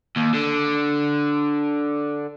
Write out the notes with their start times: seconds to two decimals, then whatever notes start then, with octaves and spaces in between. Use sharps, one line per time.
0.17 D#2
0.35 D3